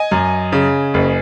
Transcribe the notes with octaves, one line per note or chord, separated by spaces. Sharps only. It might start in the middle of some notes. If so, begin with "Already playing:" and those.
Already playing: D#5 G#5
F#2
C#3
F#1